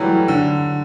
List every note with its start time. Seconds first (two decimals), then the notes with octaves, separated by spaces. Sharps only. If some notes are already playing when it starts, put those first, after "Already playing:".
Already playing: E3 F#3 G3 A3
0.28 D3